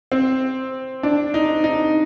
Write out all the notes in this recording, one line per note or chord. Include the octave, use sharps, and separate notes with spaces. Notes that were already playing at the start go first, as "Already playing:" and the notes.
C4
D4
D#4
D#4